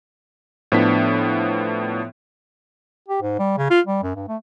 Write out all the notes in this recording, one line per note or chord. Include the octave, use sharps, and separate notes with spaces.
A2 F3 B3 D4 B6
G4
G#2
G3
C#3
F4
G3
F#2
G2
A3